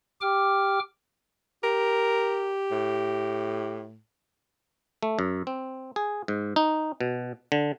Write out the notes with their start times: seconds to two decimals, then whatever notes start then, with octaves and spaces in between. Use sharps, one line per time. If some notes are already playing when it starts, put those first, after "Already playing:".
0.21 G4 G5 D6 F6
1.63 G4 A#4
2.71 A2
5.03 A3
5.19 F#2
5.47 C4
5.96 G#4
6.28 G#2
6.56 D#4
7.01 B2
7.52 D3